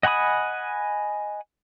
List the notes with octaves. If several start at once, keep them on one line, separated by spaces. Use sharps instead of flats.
D#5 F#5 G#5 B5 D#6